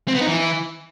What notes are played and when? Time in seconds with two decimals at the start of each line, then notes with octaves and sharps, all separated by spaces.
0.08 C4
0.15 B3
0.21 D#4
0.27 E3